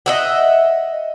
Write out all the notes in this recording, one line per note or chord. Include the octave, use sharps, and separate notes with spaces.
D#5 E5 F#5